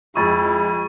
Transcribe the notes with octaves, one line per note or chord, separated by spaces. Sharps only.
F2 G#3 E4 C#6 D#6 A6